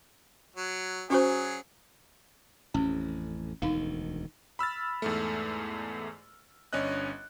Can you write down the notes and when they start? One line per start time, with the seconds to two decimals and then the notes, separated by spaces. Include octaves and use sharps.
0.56 F#3
1.10 F#3 C#4 F#4 G#4 C5
2.74 A1 F2 C#4
3.62 E1 D2 D#3 D#4 F5
4.59 B5 E6 F6 A6
5.02 E2 G#2 A3
6.73 G1 C#4 D4 D#5 F#6